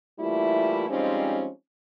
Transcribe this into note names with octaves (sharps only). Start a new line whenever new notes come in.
E3 G3 A3 A#3 E4 F4
F3 G3 G#3 C4 C#4 D#4